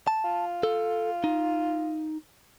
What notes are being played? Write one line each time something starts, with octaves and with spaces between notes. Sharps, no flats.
A5
F4
A4
D#4